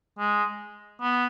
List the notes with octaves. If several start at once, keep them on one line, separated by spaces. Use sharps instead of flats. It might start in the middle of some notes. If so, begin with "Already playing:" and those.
G#3
B3